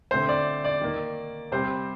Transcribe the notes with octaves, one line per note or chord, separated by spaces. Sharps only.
D3 A3 C4 C5
D5
D5
D#3 A#3
C3 G3 C4 C5